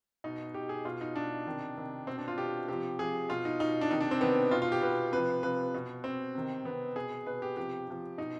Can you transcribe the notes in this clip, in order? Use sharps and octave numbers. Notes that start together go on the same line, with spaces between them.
B2 D#4
B2 G4
G#4
B2 F4
D#4
B2 D4
C3 D#3
C3 D#3
B2 C4
D4
F4
B2 G4
C3 F3 G4
C3 F3 G#4
B2 F4
D#4
B2 D#4
D4
C3 D#3 D#4
D4
C4
C3 D#3 B3
B2 F4
F4
G4
B2 B4
C3 F3 B4
C3 F3 B4
B2
B2 C4
C3 D#3
C3 D#3 B3
B2 G#4
B2 B4
G4
C3 F3 G4
C3 F3
B2 D#4